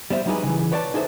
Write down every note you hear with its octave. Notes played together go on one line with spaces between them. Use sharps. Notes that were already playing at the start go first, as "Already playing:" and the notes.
G3 B3 C5 E5
F#3 G3 D#4 G4 G#4 B4
C#3 E3
B4 C#5 D5 G5 A5
D#4 G#4 A4 C5 E5